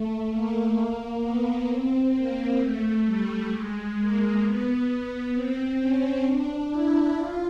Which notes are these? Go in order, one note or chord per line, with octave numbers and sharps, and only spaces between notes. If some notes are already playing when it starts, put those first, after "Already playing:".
Already playing: A3
A#3
B3
C4
A#3
A3
G3
G#3
A#3
B3
C4
C#4
D4
E4
F4